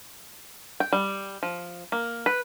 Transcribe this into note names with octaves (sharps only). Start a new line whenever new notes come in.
G5
G3
F3
A#3
B4